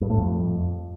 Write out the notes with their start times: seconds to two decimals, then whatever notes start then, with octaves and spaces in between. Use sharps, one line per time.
0.01 G2
0.10 A2
0.18 F2